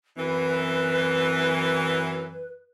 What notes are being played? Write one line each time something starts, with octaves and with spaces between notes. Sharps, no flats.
F#2 E3 C4 B4